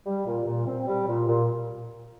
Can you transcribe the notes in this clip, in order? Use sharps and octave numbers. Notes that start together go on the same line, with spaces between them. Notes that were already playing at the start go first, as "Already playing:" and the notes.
G3
A#2
A#2
C4
G3
A#2
A#2